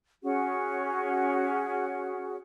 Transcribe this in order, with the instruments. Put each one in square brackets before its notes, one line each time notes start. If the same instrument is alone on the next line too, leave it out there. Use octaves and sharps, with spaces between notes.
[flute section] C#4 F#4 G#4